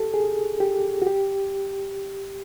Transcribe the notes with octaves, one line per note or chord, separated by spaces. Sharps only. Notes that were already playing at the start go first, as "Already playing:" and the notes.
Already playing: G4 A4
G#4
G4
F#4
G4